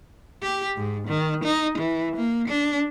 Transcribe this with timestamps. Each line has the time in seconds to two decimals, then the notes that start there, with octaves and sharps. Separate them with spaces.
0.43 G4
0.77 G#2
1.08 D#3
1.44 D#4
1.78 E3
2.16 A#3
2.48 D4